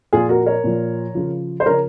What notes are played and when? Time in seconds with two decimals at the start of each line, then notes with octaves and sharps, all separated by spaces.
0.13 A#2 F3 F4 G#4
0.29 F#4 A#4
0.46 A#4 C#5
0.64 A#2 F3
1.15 C#3 F3
1.60 C5
1.66 C#3 F3 A#4 C#5